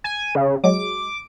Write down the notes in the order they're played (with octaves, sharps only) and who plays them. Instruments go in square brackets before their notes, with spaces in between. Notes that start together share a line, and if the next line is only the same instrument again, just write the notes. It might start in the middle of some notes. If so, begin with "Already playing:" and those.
[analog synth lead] G#5
C#3
[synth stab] F#3 G#3 [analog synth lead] D6